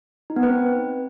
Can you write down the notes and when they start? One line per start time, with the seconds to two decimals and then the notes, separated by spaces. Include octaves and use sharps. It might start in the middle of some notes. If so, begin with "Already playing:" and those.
0.30 D#4
0.36 B3
0.43 B4
0.50 C4